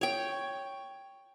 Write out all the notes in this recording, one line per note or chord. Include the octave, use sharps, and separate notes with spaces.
C#5 G5